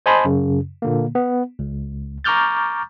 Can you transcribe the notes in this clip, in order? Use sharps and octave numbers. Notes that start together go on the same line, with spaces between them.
C5 D#5 G#5 A5 B5 C6
F#2 C#3
A#2 D3 A#3
B3
C#2
A#5 C#6 D6 F6 G6 A6